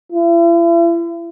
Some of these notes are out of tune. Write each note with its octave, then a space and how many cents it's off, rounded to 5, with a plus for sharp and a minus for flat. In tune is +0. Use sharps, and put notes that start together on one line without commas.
E4 +40